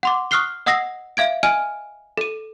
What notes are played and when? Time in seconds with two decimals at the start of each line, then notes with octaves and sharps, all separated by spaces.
0.03 F#5 C6 D6
0.31 C#6 D#6 F6 F#6 C7 G7
0.66 D#5 F#5 D#6 E6 A#6 C7
1.17 E5 F5 G#6 D7
1.43 D#5 G#5 F6 D7 D#7
2.17 A4 D#7